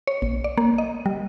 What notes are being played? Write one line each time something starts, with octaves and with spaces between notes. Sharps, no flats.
C#5
A#1
D5
A#3
D#5
G3